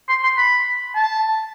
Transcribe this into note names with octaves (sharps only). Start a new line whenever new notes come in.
C6
C6
B5
A5